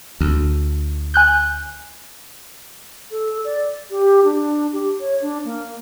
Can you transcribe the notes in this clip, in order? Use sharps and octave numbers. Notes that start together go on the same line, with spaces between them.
D2
G#5 F#6 G6
A4
D5
G4
D4
G4
C#5
D4
A#3